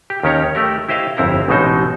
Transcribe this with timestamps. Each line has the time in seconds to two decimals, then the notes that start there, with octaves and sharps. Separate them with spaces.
0.10 G4
0.23 D#2 D#3 C#4 G4 C#5 A#5
0.55 A3 G4 A#4
0.89 E4 G4 C5 D#5 F5
1.17 G1 F2 C4 E4 A#4 A#5
1.48 A1 B2 G#3 C4 D#4 C5